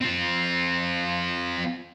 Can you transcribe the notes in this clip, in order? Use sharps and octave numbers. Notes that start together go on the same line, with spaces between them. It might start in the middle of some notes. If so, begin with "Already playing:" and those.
C4 F4